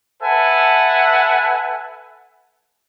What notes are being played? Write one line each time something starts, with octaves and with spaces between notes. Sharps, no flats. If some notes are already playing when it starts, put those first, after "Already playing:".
A4 B4 E5 F#5 G#5 A5